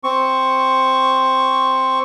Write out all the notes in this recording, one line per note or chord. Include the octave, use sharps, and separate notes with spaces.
C4 C#6